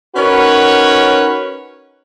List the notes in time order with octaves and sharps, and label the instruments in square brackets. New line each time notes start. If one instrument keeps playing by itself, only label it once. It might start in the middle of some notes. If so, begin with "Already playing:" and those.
[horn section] C#4 D#4 F#4 A#4 B4 C#5